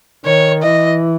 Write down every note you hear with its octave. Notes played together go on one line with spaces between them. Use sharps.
D#3 C#5
E3 D#5